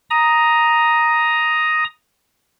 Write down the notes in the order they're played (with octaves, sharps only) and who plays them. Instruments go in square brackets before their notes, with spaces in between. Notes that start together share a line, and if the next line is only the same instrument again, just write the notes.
[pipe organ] A#5 D#6